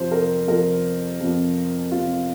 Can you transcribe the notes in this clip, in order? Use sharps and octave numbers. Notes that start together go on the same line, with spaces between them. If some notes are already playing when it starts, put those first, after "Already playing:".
Already playing: F2 C3 F3 C5
A#4
F2 C3 F3 A#4
F2 C3 F3
F2 C3 F3 F4